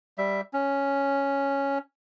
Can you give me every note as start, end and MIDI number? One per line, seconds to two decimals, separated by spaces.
0.18 0.41 55
0.18 0.41 76
0.53 1.78 61